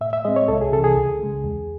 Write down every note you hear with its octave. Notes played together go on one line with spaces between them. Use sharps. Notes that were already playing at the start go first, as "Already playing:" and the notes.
A2 E5
E5
G#3 C4 D#5
C#5
C2 A4
G#4
C3 A4
E3
G#4
C#2
C#3 G#3
E2